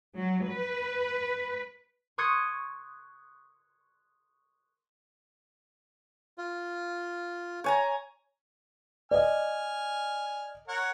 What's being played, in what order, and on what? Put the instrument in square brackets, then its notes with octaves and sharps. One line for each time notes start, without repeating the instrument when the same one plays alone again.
[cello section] F#3
B4
[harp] C6 C#6 D#6 F#6 G#6 C#7
[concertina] F4
[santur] C#5 G#5 A#5
[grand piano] D5 D#5 [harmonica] G#5 F6
[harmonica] A#4 C#5 F#5